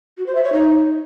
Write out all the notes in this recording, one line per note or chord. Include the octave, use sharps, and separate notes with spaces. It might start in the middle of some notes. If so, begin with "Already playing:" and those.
F#4
C5
E5
C#5
D#4